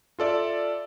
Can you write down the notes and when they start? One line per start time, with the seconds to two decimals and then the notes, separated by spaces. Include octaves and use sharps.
0.19 F4 A4 D5 E5